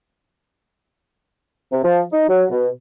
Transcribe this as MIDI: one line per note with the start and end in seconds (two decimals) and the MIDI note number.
1.72 1.83 48
1.83 2.02 53
2.12 2.24 63
2.29 2.44 54
2.50 2.69 47